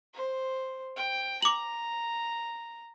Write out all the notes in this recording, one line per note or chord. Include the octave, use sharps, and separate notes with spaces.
C5
G5
A#5 D6 F#7